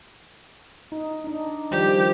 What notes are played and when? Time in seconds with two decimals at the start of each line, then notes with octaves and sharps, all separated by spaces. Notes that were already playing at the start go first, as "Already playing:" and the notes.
0.92 D#4
1.24 D4 D#4
1.71 D#3 F3 G3 G4